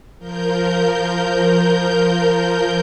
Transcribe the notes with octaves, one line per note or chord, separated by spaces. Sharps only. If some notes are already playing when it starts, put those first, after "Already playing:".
F3 A#4 G6